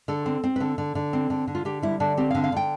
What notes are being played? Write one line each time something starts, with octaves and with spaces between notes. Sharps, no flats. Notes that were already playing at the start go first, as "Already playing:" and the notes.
D3 A4
C4
C4
B4
D3 A4
D3
D3
C4
D3
D3
F4
D3 G4
G3 E4
D3 D4
C4 G4
D3 F5
F5
D3 G5